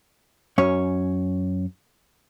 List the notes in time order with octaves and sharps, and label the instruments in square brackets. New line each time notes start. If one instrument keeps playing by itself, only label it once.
[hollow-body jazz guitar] F#2 C#4 C#5